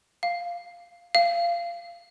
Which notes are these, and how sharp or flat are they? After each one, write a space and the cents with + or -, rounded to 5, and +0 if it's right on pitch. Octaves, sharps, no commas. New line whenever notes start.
F5 +0
F5 -20